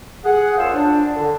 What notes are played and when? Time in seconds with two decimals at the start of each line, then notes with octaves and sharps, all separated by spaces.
0.24 G#4 F#5
0.57 F#2 F4 C5 C#5 F5 E6
0.74 D4
1.15 D3